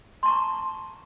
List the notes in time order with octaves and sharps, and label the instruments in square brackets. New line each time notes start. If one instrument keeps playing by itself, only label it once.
[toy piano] C6
A5
C#6
A#5